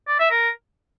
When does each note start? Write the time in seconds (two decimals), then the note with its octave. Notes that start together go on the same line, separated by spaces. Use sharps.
0.08 D5
0.19 E5
0.31 A#4